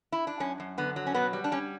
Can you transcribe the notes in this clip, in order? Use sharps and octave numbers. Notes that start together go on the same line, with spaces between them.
E4
D4
F#2 C#4
F#2
D3 B3
F#3
C#4
B2 B3
G3
D4
G3 C#4